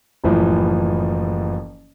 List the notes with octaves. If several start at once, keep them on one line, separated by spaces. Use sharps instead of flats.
F#1 A2 E3 F3